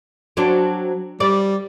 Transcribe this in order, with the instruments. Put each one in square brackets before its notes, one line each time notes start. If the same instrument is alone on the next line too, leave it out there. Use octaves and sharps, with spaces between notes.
[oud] F#3 C4 D4
[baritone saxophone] G3 [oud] D5